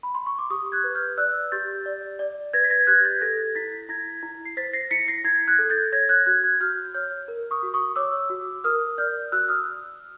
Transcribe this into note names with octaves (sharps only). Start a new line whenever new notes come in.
B5
C6
C#6
D6
G4 C#6 D#6
F#6 G#6
B4
F6 G6
D5 E6 F#6
G4 G6 A6
D5
D5
B4 G#6 A#6
B6
G#6 A#6
G4 F#6 G#6
G6 A6
A4 G#6 A#6
E4 A6 B6
E4 G#6 A#6
E4
C7
C5 A6 B6
A#6 C7
E4 B6 C#7
A#6 C7
E4 G#6 A#6
F#6 G#6
A4
G6 A6
C#5 G#6 A#6
F#6 G#6
F#4 F#6 G#6
F#6 G#6
F#4 F6 G6
C#5 F6 G6
A#4
C#6 D#6
F#4
C#6 D#6
C#5 D6 E6
F#4
A#4 D#6 F6
D5 F6 G6
F#4 E6 F#6
D#6 F6